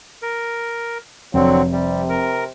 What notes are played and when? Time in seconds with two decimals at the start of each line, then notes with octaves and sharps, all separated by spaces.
0.22 A#4
1.34 F1 D3 F#3 C4
1.72 C3 G3
2.09 A#4